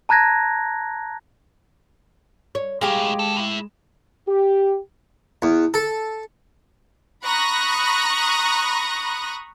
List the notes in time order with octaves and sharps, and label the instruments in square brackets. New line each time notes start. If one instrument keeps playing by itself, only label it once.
[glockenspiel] A5 A#5 F#6 G#6 A#6
[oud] C#5
[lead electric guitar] B1 A2 [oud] G#3 [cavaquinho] G4 F5 G#5
[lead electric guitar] D#2 A4
A2 E4
[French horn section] G4
[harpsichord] E2
A4
[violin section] A#5 B5 C#6 D#6 F#6 A#6